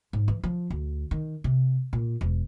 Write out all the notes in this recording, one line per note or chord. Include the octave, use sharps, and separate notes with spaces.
G#2
E3
F3
D2
D#3
C3
A#2
E1